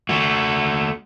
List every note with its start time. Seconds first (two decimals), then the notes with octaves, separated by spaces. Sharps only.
0.09 A3 F#4